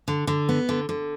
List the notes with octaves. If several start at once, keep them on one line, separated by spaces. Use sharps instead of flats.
D3
D3
B3
D3
D3